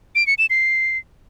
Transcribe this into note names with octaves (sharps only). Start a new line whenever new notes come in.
D7
C#7
E7
C7